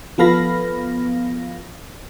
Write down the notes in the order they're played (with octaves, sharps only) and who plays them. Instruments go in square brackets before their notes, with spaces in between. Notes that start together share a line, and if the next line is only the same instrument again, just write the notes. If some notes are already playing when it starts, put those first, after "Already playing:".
[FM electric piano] F3 B3 A4 F5 B5 A#6